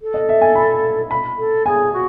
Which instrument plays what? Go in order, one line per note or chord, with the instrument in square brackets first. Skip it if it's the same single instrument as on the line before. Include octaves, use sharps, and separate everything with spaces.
[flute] A4
[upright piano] D#5
E5
G#5
B5
B5
[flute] A4
[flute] G#4 [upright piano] G#5
[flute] F#4